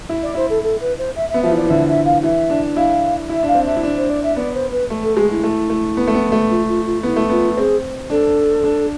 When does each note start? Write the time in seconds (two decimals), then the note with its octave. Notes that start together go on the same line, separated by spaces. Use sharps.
0.09 E4
0.22 D5
0.35 E4 C5
0.49 A4
0.63 A4
0.80 B4
0.98 C5
1.16 E5
1.29 E5
1.34 B3
1.42 F3 E5
1.51 E3
1.57 D5
1.65 E3
1.69 D3 E5
1.88 E5
2.05 F5
2.23 E3 E5
2.50 D4
2.76 E4 F5
3.29 E4 E5
3.43 D4 F5
3.55 C4
3.66 D4 E5
3.76 E4
3.83 D4
3.97 C5
4.09 D5
4.23 E5
4.36 B3 D5
4.54 C5
4.72 B4
4.90 A3
5.03 A4
5.17 G#3 G#4
5.30 E4
5.43 A3
5.70 A3
5.97 B3
6.07 A3
6.14 B3
6.32 A3
6.50 F4
6.68 F4
6.85 F4
7.03 B3 E4
7.16 A3
7.29 B3 F4
7.57 C4 G#4
8.10 D4 A4
8.64 D4